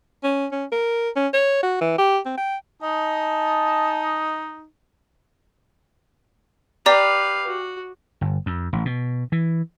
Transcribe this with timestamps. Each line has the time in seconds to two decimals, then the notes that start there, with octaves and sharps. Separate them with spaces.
0.24 C#4
0.52 C#4
0.72 A#4
1.16 C#4
1.34 C#5
1.63 F#4
1.81 E3
1.98 G4
2.25 C4
2.37 G5
2.83 D#4 D#5 G#5 A5
6.86 G4 B4 D5 F5 A#5
7.47 F#4
8.21 G1
8.46 F2
8.73 A1
8.85 B2
9.32 E3